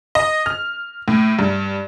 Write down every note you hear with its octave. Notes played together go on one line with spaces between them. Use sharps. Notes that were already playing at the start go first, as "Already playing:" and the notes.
D#5
F6
A2
G2